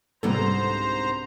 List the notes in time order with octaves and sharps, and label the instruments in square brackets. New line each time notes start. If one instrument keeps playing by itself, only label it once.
[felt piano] C2 [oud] G#2 B2 D3 [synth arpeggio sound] G3 A4 [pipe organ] C5 A#5